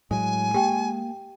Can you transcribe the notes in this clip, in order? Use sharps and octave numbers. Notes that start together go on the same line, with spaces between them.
A2 F#3 G#3 G#5
A#3 G4 G5